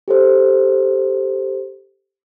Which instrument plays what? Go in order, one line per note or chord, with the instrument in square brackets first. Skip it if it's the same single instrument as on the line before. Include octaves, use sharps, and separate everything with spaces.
[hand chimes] G4 A4 C5